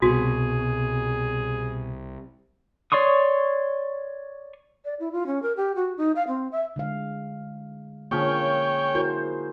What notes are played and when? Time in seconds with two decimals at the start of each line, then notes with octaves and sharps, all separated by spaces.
0.02 C2 B2 F#4 G#4
2.92 C#5 D5 C6 C#6 D#6
4.85 D5
5.00 E4
5.12 F4
5.27 C#4
5.42 A#4
5.57 G4
5.76 F#4
5.97 D#4
6.16 F5
6.28 C4
6.52 E5
6.76 D3 G#3 F5
8.11 D3 F3 A#3 C#4 G#4 C#5 G5
8.95 E4 F#4 A#4 C5